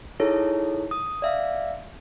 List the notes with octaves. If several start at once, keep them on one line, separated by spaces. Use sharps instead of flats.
D#4 E4 G#4 A4 C#5
D#6
D5 E5 F5